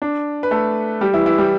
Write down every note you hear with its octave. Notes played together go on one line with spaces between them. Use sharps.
D4
B4
A3 A4
G3 G4
E3 E4
E3 E4
G3 G4